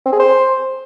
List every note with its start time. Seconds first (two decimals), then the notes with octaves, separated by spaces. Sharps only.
0.06 C4
0.13 G#4
0.20 C5